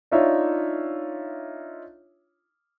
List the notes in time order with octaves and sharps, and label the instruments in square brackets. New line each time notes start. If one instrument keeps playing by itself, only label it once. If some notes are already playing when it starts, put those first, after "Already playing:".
[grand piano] D4 D#4 F4 C#5 E5